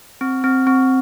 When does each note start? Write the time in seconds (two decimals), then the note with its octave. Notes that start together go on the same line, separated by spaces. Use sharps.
0.21 C4
0.44 C4
0.67 C4